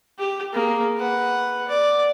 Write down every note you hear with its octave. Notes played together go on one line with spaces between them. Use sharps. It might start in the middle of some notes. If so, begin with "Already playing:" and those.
G4
A#3 G#4
B4 F#5
D5